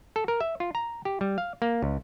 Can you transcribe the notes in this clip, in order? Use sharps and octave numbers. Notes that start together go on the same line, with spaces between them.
A4
A#4
E5
F4
A#5
G4
G3
F5
A#3
C#2